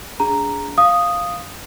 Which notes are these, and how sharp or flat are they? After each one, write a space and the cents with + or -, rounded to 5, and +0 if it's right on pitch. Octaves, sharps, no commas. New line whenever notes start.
D4 -40 G#4 +0 A#5 +0
F5 +0 D#6 -5